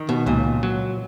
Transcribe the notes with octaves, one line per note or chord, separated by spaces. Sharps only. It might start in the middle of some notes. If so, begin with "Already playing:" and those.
Already playing: D#3
B2
C#2 A#2
F#3